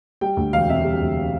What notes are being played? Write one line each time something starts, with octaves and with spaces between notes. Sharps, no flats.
G3 G5
D2
E1 F5
C3 E5
G3
D2